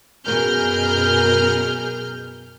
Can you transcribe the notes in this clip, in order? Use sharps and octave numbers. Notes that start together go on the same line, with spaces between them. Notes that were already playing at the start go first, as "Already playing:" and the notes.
F#2 B2 G#4 A#4 F6 G6